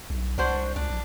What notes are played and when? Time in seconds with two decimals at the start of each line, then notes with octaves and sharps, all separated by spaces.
0.10 B1
0.38 C2 D4 F#4 C5
0.76 C#2 D4
0.90 A#1